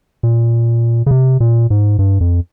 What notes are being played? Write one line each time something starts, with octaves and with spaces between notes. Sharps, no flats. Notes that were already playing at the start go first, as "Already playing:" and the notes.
A#2
C#3
C3
A#2
G#2
G2
F2